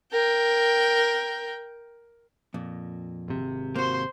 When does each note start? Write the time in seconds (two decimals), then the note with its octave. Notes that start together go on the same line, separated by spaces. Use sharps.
0.12 A#4 G5
2.54 F2 A#2
3.28 G#1 C3
3.76 A#3 F#4 C5 C6